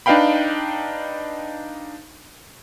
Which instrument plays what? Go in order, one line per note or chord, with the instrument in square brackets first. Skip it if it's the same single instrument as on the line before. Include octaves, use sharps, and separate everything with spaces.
[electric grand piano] D4 D#4 B4 F5 G5 B5